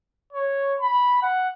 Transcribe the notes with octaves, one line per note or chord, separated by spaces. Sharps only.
C#5
B5
F#5